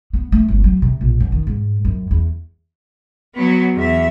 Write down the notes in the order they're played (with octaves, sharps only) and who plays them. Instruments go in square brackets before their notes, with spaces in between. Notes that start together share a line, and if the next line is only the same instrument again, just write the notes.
[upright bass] B3
A3
G1
F#3
C3
A#1
F#2
D#3
G#2
F#2
E2
[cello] F#3 B3
E2 E5